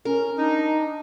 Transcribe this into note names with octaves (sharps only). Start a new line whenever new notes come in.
C#4 A#4
D4 D#4